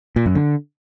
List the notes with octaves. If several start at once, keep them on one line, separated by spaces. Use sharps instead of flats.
A#2
F#2
D3